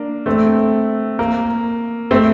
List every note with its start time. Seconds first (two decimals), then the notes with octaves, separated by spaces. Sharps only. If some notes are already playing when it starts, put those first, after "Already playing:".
Already playing: A#3 D4
0.26 A3 C4
1.19 A#3
2.11 A3 C4